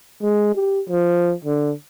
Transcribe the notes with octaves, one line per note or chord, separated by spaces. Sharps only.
G#3
G4
F3
D3